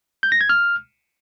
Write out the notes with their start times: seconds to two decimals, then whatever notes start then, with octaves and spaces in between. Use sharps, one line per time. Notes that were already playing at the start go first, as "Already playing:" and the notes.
0.23 G6
0.32 A#6
0.41 G#6
0.49 F6